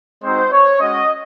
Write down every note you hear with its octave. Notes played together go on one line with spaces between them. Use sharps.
G#3 C4 D#4 F#4 C5
C#5
G#3 C#4 F#4 D#5